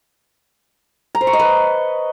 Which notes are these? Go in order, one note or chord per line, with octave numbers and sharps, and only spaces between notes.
A#5
C5
C#6
D#5
B4